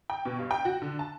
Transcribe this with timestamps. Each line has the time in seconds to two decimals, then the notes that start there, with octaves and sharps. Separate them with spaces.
0.10 G5
0.25 B2
0.39 G2
0.51 G5
0.65 F#4
0.82 D3
0.99 A5